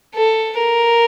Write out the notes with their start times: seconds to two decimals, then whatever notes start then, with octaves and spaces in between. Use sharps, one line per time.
0.14 A4
0.58 A#4